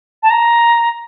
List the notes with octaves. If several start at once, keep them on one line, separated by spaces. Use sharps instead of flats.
A5
A#5